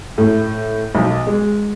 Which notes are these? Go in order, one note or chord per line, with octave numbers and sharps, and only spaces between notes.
A2
B1
G#3